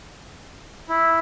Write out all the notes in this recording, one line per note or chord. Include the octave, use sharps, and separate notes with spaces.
E4